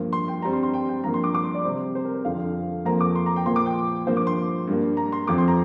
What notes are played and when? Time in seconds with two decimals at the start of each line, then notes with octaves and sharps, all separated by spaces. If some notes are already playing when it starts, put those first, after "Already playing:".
Already playing: G2 F3 A#3
0.13 C6
0.28 G5
0.42 G2 G3 C4 A#5
0.53 C6
0.63 C6
0.74 G5
0.89 G5
1.04 G2 F3 A#3 A#5
1.14 C6
1.24 D6
1.35 D6
1.44 C6
1.54 D5
1.64 C3 G3 C4
1.95 C5
2.05 A#4
2.15 C5
2.25 F2 D3 F3 F5
2.85 F2 F3 A#3 A#5
3.01 D6
3.16 C6
3.26 A#5
3.36 G5
3.46 A#2 F3 A#3 C6
3.56 D6
3.66 G5
4.07 G2 F3 A#3 C5
4.17 D6
4.27 C6
4.67 G2 G3 A#3
4.97 A#5
5.12 C6
5.27 F2 F3 C4 D6
5.38 C6
5.48 A#5